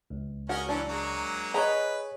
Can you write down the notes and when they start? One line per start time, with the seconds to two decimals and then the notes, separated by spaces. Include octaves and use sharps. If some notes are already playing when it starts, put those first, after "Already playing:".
0.10 C#2
0.49 C#4 F#4 G#4 A#4
0.69 E3 F#3 C#4 D4
0.88 F#3 G#3 A#3
1.54 G#4 B4 C#5 D#5 A#5